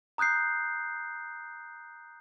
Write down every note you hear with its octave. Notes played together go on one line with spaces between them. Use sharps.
A#5 D#6 F#6 G6 C7